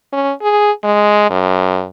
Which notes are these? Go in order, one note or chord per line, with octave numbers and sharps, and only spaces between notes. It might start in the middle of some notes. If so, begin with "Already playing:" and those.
C#4
G#4
G#3
F#2